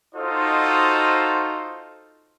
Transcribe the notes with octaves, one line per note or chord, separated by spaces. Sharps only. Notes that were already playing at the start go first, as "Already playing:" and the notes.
D#4 F4 F#4 A4 C5 D#5